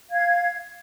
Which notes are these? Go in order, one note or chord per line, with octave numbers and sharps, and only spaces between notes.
F5 G#6